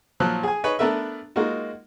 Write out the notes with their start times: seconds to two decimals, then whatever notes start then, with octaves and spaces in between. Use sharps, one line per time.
0.20 A#2 F3 F#3 F#6
0.43 G#4 G#5
0.64 D#4 G#4 B4 C#5
0.79 A3 B3 D4 A#4 B4 E5
1.36 G#3 A#3 D#4 F4 F#4